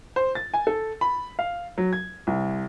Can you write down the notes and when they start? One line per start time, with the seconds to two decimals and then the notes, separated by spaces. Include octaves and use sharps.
0.16 C5
0.35 A6
0.54 G#5
0.67 A4
1.01 B5
1.39 F5
1.78 F#3
1.93 G#6
2.27 C2